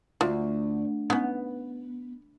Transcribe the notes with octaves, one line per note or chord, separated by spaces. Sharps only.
D2 F4 F#4
B3 C#4 D#4